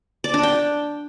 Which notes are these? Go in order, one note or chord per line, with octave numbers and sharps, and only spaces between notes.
D5
D4
G5